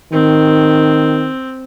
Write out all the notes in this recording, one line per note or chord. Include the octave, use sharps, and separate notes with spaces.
D#3 C4